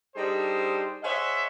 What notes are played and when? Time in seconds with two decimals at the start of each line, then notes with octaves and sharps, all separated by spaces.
0.16 G3 D4 D#4 G#4 A4 C5
1.03 G#4 C5 C#5 D#5 E5 F#5